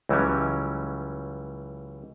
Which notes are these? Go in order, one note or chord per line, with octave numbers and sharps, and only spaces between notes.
C#2 E3 F#3 G3 C#4